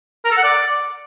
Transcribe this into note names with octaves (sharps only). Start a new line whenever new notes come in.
A#4
A4
F#5
D5